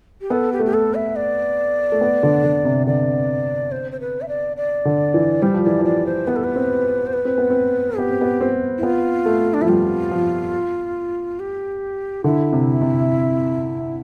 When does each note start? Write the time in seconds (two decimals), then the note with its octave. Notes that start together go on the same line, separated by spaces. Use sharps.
0.21 G4
0.30 B3 A4
0.52 G4
0.59 A3
0.66 G4
0.73 A4
0.94 E5
1.16 D5
1.92 A3
2.01 B3
2.23 D3
2.44 D3
2.65 C3
2.87 D3 D5
3.71 C5
3.92 C5
4.00 B4
4.21 E5
4.28 D5
4.57 D5
4.85 D3
5.14 E3
5.42 G3 C5
5.54 F3
5.64 E3 D5
5.79 F3
5.85 D5
6.06 C5
6.27 B3 B4
6.36 A4
6.44 B4
6.56 C4
7.06 C5
7.13 B4
7.25 C4
7.38 B3
7.50 C4
7.98 B3 G4
8.10 C4
8.21 B3
8.41 C4
8.78 E4
8.83 B3 F4
9.26 A3
9.54 D4
9.61 F3 E4
9.68 G3 F4
10.11 F3
11.39 G4
12.24 D3 E4
12.52 C3
12.81 C3